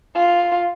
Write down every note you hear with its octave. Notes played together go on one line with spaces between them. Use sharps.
F4